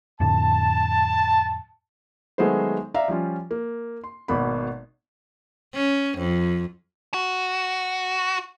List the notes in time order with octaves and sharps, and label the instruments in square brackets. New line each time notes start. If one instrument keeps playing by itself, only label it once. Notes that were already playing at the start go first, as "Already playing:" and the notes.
[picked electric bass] F2 A2 D3 [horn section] A5
[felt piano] D#3 F#3 G#3 A3 B3 C5
D5 E5 F5 A#5
F3 G3 C#4 F4
A#3
C6
G#1 B2 A#3 B5
[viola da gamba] C#4
F2
[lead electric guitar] F#4